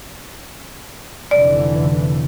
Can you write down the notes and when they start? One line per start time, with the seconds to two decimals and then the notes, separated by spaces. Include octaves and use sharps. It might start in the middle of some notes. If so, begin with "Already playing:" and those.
1.31 F1 D3 E3 D5